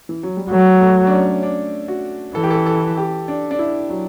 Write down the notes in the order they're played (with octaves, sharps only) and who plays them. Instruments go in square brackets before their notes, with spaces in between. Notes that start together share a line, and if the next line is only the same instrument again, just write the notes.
[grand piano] E3
F#3
G3
[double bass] F#3 [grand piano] A3
[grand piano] A3
D4
C#4
D4
F#4
[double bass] E3 [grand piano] A4
[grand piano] G4
A4
A4
G4
D4
D4
E4
F#3